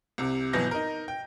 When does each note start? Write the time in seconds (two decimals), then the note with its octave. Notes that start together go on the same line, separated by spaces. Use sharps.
0.18 C2 C3
0.53 G1 B2 E3 F#3 G6 A#6
0.71 D#4 A#4
1.08 G5